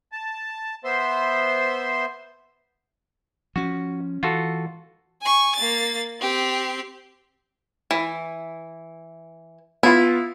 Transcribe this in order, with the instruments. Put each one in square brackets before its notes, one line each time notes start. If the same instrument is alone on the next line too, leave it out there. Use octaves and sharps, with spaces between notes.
[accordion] A5
B3 C5 E5 C6
[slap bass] F3 C#4 [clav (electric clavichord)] F#4
[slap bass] E3 [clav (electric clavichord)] F4 F#4 A4
[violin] G#5 C#6
A#3 A6
C4 G4
[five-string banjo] E3
[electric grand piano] B3 F4 [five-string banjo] E4